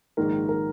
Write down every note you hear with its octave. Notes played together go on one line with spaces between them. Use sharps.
A#1 G#2 D#3 A#4
D#3 A#4